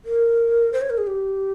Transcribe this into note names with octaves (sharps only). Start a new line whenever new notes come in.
A#4
C5
C#5
A#4
G#4
G4